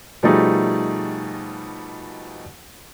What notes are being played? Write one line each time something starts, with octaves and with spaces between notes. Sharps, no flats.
B2 F3 G3 A3 D#4 G#4